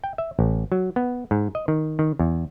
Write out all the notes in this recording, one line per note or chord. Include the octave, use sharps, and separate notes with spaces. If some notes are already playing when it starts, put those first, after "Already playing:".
G5
E5
A1
F#3
B3
G#2
D#5
D#3
D#3
E2